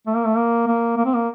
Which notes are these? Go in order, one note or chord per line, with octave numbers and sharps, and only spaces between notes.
A3
A#3
A3
A#3
A#3
A#3
C4
A#3